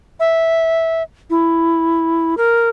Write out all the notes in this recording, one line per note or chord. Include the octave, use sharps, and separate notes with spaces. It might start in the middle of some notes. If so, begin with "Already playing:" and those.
E5
E4
A#4